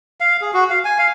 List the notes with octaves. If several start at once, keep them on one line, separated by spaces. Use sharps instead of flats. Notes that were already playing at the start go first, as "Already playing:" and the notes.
F5
G#4
F#4
F5
G#5
F5